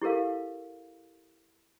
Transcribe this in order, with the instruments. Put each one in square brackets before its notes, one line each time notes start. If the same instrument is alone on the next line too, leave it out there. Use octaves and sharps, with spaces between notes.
[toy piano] E4 G4 A4 A#4 F5